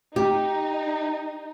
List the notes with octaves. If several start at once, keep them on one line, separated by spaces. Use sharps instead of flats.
D#4 G4